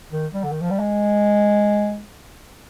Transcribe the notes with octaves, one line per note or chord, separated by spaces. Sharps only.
D#3
G3
D3
D#3
F3
G3
G#3